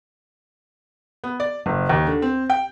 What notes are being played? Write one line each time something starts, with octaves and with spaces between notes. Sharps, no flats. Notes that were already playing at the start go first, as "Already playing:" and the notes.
B3
D5
F#1
D#2
D3
C4
G5